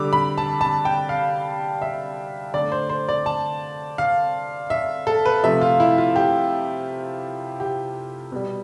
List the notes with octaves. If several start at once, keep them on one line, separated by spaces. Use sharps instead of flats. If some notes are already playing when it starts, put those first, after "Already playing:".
Already playing: D3 G3 D6 E6
B5
A5
A5
G5
F5
E5
D3 A3 D5
C5
C5
D5
A5
F5
E5
A4
B4
C3 F3 A3 E5
F4
E4
F4
G4
G4
B2 G3